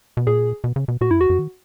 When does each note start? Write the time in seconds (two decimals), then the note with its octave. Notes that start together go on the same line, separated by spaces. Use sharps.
0.17 B2
0.27 A#2 G#4
0.64 B2
0.76 C#3
0.88 B2
1.01 A#2 F#4
1.10 F#2 E4
1.20 E2 F#4
1.30 F#2
1.39 D#3